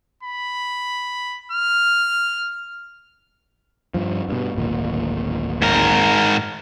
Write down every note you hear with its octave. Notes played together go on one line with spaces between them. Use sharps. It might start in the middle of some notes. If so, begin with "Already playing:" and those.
B5
F6
G2 F3
G2 B2
D1 G#1 A#2
G#2 A#4